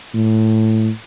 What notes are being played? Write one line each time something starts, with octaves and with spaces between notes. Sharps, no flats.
A2